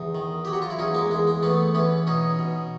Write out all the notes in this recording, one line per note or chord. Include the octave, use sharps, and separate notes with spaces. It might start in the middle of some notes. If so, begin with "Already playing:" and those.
Already playing: E2 D#4
D#3
F#3 G4
F#4
F4
E4
E2 C#4 D#4
G#3 A#3
E2 G#3
G#3
E3 A3 B3
E3 B3 C#4
B2 C#4 D#4
B2